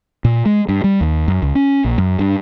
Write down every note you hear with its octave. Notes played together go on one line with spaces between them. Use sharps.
A#2
G#3
G2
G3
D#2
F#2
C#2
C#4
A#1
F#2
G2